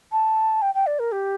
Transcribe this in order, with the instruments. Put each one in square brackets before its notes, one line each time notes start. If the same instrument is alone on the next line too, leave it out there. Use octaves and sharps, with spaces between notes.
[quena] A5
G5
G5
D5
A#4
G4